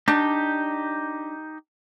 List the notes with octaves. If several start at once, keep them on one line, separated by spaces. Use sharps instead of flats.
D4 D#4 G4